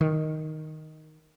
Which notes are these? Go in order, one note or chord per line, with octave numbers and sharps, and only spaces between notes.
D#3